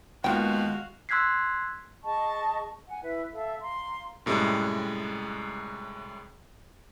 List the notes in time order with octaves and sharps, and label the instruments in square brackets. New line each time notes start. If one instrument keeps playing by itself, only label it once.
[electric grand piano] D#2 B3 [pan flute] G#3 [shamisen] F4 G5 [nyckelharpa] F#4 F5
[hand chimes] C6 E6 F#6 G#6 B6 C7
[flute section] G#4 D#5 A5 C#6
F#5 G#5
E4 B4 E5
A4 E5 F5
F5 A#5 C6
[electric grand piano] F#2 A2 C3 G3 G#3